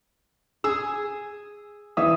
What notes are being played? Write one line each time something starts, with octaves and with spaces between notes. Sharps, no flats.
G#4 E6
E3 E5 D#6